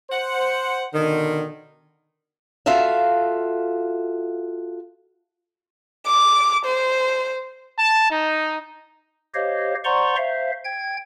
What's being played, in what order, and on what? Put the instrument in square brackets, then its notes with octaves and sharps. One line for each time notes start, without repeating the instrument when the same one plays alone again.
[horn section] C5 F#5
B2 D3 D#3
[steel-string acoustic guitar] F4 F#4 A4 E5 F5
[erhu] D6
C5
[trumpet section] A5
D#4
[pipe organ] G4 C5 C#5 D#5 F5
C5 D5 F#5 A#5 C6 C#6
C5 E5 F5
G5 G#6